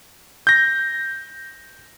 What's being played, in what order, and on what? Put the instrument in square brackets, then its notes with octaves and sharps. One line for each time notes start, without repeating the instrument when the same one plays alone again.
[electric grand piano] G6 A#6